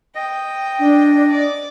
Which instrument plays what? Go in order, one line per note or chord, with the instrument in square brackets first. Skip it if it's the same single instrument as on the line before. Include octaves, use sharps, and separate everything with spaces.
[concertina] D#5 [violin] G5
[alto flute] D4
[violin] D5